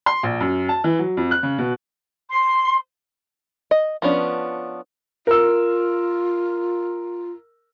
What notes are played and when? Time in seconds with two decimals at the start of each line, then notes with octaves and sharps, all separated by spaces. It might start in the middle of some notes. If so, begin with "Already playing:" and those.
0.06 C6
0.23 A#1
0.40 F#2
0.69 A5
0.84 E3
0.99 F#3
1.17 F2
1.31 F#6
1.43 C#3
1.58 B2
2.30 C6
3.71 D#5
4.02 F3 B3 C#4 D4
5.27 F4 A#4 E6